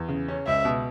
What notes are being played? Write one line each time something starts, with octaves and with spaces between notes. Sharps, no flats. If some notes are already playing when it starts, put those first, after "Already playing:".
Already playing: E2
C#3
C#4
C#2 E5
B2